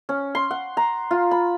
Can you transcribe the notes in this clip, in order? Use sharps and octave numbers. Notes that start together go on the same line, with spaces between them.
C#4
C6
F#5
A#5
F4
B5